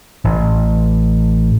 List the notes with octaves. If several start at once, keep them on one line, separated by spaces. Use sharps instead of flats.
A1